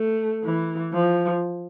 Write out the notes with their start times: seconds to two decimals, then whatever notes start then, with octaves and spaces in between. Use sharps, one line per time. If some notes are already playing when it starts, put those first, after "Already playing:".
Already playing: A3
0.44 E3
0.93 F3